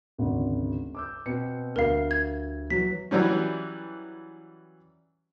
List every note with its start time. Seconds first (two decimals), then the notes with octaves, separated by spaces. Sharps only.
0.18 G#1 D2 C#3
0.95 D6 E6 G6
1.26 B2 C4 C#7
1.76 D2 G3 A#4 F5
2.11 G#6
2.70 E3 F#3 B6
3.11 E3 F#3 G3 C#4